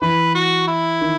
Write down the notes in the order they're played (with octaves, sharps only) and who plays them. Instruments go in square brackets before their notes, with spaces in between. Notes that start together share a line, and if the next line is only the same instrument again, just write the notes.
[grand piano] E3 [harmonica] B4
[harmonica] F#4
E4
[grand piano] D#3